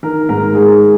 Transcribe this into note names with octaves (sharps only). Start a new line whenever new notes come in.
D#3 A#4
G#2 A#4
G#3 G#4